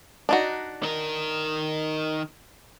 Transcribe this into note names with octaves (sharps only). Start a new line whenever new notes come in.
D4 D#4 F#4
D#3 A#4